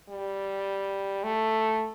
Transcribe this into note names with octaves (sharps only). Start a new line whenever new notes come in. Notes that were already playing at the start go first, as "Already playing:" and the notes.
G3
A3